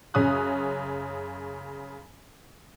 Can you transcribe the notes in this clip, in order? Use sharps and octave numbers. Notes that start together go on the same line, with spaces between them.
F#2 C#3 C#4 D#6 F#6